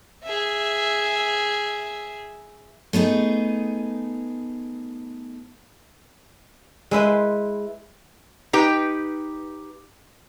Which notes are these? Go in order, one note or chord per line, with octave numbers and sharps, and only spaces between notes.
G#4 E5
A3 B3 D#4 G#4
G#3 E4 B4 C5
D#4 G4 B4 G5